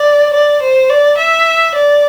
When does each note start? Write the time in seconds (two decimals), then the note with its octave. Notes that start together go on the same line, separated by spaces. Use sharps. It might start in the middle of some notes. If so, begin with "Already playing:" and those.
Already playing: D5
0.34 D5
0.62 C5
0.89 D5
1.18 E5
1.75 D5